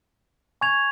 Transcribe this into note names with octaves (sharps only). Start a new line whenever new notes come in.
G#5 C#6 G#6 F7